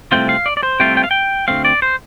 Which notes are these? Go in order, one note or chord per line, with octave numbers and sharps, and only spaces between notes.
C2 C3 A3 C4 F4 G5
F5
D5
D5
C5
C2 C3 A3 C4 F4 G5
G5
F5
G5
D2 C3 A3 C4 F5
D5
C5